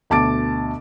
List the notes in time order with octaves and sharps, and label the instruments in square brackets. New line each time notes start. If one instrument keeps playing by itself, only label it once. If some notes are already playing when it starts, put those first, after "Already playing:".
[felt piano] D2 B2 A5 D6 A6 D7